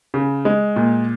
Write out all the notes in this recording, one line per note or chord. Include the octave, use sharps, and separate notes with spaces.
C#3
G#3
A#2